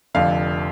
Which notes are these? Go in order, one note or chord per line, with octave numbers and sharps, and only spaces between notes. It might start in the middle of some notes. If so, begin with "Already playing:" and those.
F1 F2 D3 F5